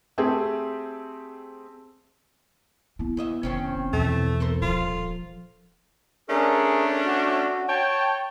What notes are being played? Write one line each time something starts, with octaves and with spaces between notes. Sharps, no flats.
A3 C4 G4 G#4
B3 E4
E2 D#5 E5
F1 D#3 C4 C#4
B1 E2 E3 A3
A4 A#4 C5
D#1 F3 F4
A3 C#4 D4 G#4 A#4
F#4
C#5 G5 A5